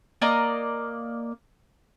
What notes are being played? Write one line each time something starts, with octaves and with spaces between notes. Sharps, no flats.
A#3 D5 D#5 A#5